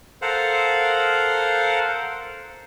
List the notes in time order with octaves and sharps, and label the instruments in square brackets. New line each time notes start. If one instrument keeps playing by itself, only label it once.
[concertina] A4 A#4 C5 F5 F#5